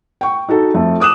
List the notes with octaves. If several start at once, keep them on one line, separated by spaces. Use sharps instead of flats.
G5 C#6
D#4 F#4 A4
F2 A3
D6 D#6 F#6 E7